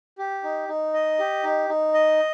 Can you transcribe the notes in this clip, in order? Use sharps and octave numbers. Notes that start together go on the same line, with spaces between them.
G4
D#4
D#4
D#5
G4
D#4
D#4
D#5